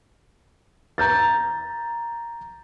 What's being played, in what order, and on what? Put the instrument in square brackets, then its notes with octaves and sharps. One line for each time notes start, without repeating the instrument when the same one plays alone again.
[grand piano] A#5 G6 A6